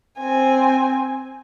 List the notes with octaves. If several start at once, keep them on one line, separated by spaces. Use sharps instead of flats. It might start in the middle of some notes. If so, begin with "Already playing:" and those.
C4 G#5